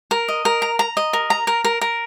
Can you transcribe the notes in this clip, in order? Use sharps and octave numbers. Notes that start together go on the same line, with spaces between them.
A#4
D#5
A#4
A#5
A#5
D#5
A#4
A#5
A#4
A#4
A#4